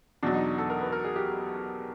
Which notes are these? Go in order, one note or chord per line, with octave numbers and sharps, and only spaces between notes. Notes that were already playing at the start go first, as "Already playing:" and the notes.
E2 B2 F#3 D4
D#4
A4
A#4
B4
A#4
G#4
G4